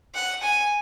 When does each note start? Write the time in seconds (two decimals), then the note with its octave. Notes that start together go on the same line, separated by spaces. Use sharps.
0.14 F#5
0.42 G#5